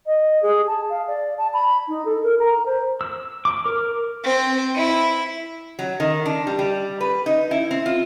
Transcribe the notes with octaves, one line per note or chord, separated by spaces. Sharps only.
D#5
G#4
A5
F5
D5
A5
B5
D#4
A4
A#4
A#5
C5
E6
D6
A#4
C4
E4
F#3
D#3
D4
G3
G3
B4
D#4
E4
C4
F4